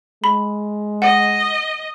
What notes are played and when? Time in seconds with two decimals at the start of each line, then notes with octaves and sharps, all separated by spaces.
0.24 G#3 B5
1.02 D#5 F#5